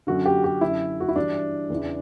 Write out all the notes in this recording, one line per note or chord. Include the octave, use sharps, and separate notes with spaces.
F#2 D3 F#4
G4
G4
F#2 D3 E4
F#4
E4
G2 E3 D4
E2 C#3 E3